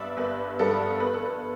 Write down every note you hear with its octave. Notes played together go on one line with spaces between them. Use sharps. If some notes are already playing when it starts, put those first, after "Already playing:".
Already playing: G1 G2 G3 B3 D4 D5 E5
G1 B4
G2 G3 B3 D4 A4
G1 B4
A4
B4